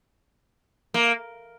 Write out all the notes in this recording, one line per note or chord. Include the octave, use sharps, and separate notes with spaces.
A#3